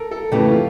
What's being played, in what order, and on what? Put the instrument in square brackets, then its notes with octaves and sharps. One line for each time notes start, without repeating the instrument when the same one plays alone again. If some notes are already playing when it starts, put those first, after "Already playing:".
Already playing: [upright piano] A4 A#4
A4
[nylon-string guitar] F2 C#3 E3 A3 [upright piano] G4
[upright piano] F4